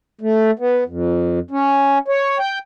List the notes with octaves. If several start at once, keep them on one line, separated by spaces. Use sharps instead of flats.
A3
B3
F2
C#4
C#5
G5